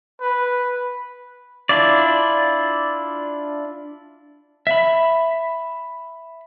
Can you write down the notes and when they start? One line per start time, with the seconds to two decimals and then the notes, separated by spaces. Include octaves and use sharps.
0.21 B4
1.69 D4 E4 F4 D5
4.67 E5 B5